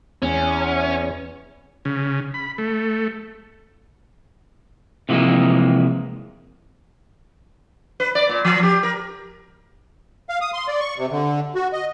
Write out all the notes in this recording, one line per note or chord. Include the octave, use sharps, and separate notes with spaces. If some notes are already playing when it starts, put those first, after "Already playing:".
E2 C#4
C#3
B5
A3
C3 E3 F3 G#3 A#3
B4
D5
A#2
F3
G4
A#4
F5
D#6
C6
D5
C#6
C3
D3
F#4
D#5